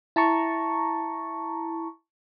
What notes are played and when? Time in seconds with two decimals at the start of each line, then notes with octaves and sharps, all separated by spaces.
0.16 E4 A5 A#5 C#6